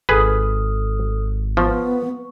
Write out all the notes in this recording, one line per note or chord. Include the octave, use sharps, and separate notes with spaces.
G#1 G#4 A4 B4 D#6 F6
F3 B3 C#6